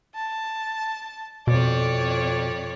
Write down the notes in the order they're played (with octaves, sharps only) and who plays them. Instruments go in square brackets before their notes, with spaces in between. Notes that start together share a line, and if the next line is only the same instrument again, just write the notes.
[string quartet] A5
[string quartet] F2 C#5 D5 [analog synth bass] B2